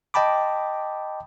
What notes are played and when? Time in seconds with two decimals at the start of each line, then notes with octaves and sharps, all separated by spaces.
0.14 D#5 G5 A5 B5 D6